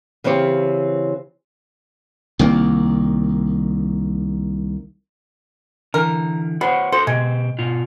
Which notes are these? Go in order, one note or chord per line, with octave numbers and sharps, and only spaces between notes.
C#3 E3 C4 G4 C#5 F5
C2 D#3 A#3
D3 E3 A#4
B3 F#4 C5 C#5
F#4 A4 C5
B2 G#3 G4
B2 F4